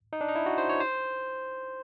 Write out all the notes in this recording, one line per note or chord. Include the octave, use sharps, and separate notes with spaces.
D#4
D4
D#4
E4
F#4
C5
C#5
C5